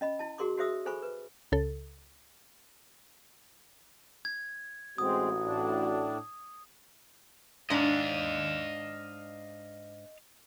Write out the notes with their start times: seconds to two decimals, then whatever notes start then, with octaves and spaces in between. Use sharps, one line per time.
0.01 C#4 D#5 B5
0.19 E4 A5
0.38 F#4 G#4 A#4 C6 D6
0.58 F#4 G#4 C5 E5 D#6 E6
0.86 G#4 A4 C5 G#5 B5 C#6
1.03 B4
1.52 C#2 C#3 A4
4.25 G#6
4.98 A1 G#3 C4 F#4 D#6
5.43 A2 D4
7.70 G#2 D4 D#5 F5